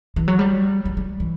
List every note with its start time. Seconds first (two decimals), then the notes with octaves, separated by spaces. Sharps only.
0.16 E3
0.28 F#3
0.39 G3
0.85 G3
0.97 G3
1.20 E3